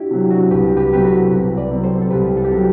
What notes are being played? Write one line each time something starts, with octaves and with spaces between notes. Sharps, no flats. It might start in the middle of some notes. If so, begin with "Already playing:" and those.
Already playing: D4 E4 F#4 G4
C3 F#3
D4 F#4
C2 G4 B4
G4 B4
C3 F#3 B4
F#4 A4
C2
B4 D5
C3 F#3
A4 C5
A4
C2 G4 B4
A4
G4
C3 F#3 F#4 A4